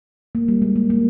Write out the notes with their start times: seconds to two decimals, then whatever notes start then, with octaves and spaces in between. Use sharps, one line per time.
0.35 A#3
0.48 G3
0.62 G#3
0.76 A#3
0.90 A#3